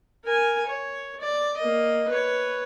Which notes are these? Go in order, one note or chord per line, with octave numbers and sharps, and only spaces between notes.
A#4 G#5
C#5
D5
A#3 D#5
B4 C#5